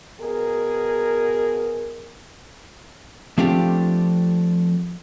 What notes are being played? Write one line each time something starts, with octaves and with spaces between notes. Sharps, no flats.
B2 G#4 A#4
F3 A3 C4 D4 F4 G4